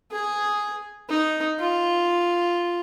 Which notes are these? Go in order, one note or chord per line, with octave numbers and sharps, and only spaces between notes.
G#4
D#4
F4